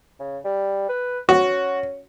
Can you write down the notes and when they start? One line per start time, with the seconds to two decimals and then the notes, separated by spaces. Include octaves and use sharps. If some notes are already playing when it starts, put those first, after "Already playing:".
0.20 C#3
0.45 G3
0.89 B4
1.29 C#4 F#4